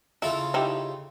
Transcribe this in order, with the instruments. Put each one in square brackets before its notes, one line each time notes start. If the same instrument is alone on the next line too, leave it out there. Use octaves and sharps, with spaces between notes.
[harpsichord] C#3 F4 A4 [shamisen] E4
[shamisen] D#4 E4 G4